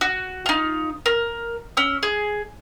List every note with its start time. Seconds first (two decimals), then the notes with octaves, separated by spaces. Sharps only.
0.01 F#4
0.46 D#4 F4
1.06 A#4
1.77 C#4 E6
2.03 G#4